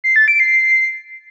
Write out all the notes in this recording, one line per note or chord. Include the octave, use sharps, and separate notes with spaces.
C7
A6
D7
C7